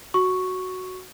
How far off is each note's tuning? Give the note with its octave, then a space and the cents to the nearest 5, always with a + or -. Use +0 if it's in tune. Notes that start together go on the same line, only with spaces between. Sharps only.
F#4 +0 C#6 +0